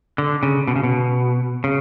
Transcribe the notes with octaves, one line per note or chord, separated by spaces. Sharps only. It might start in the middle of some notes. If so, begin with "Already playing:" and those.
D3
C#3
B2
C#3
B2
C#3